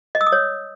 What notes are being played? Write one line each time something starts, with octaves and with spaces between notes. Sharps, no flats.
D#5
E6
D#6
C#5